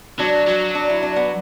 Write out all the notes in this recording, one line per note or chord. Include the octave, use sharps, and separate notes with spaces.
F#3 D4
F#3
D4
E4
D4
B3